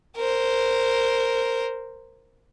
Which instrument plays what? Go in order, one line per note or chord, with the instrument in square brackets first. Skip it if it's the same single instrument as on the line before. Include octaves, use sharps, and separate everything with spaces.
[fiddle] A#4 C5